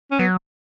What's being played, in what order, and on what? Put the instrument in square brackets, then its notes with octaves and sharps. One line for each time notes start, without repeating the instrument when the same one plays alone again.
[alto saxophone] C#4
[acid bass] F#3 [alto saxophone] B3